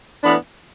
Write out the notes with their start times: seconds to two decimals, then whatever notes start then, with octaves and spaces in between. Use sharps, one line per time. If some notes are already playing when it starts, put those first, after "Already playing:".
0.22 A2 E3 B3 D4 B5